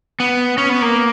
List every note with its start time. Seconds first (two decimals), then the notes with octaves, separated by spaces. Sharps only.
0.20 B3
0.58 C#4
0.70 B3
0.82 A#3